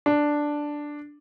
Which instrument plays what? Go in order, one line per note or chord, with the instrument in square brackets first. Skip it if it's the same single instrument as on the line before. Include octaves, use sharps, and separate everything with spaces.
[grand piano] D4